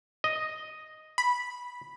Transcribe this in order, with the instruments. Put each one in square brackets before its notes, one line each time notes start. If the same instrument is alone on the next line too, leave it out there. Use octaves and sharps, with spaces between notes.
[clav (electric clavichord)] D#5
[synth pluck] B5